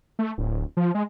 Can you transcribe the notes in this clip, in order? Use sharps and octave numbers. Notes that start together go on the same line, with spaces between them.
A3
D1
F3
G#3